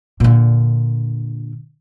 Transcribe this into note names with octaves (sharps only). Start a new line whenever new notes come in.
A#2 D3